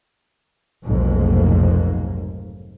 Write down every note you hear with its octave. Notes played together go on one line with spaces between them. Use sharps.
F1 B1 F2 G#2 A#3